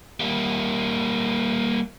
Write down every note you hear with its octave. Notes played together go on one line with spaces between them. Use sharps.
G3 A#3